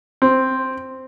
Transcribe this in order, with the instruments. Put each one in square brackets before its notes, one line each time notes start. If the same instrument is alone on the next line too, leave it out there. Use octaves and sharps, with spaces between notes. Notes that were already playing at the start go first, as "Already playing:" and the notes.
[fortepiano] C4